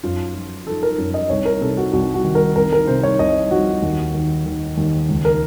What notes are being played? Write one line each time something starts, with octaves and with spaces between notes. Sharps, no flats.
F#2 F4
F3
F3 A4
A#4
F#2
D#5
C2 C#5
A#4
C3 A4
F#4
C2 F#4
F#4
D#3
A#4
C2 A#4
A#4
C3 C5
C#5
C2 D#5
F3 F#4
D#2
D#3
D#3
D#2
C#2
A#4